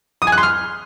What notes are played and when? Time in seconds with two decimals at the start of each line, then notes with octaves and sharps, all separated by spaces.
0.22 D#6
0.27 G#5
0.32 F#6
0.38 C6
0.43 F6